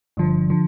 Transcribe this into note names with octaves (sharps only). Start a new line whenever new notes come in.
G1 G2 D3 F3
D3 F3